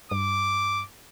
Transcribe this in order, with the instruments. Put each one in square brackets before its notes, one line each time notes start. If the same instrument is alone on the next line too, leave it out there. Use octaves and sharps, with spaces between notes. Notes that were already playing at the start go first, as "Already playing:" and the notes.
[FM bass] G2 [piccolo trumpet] D6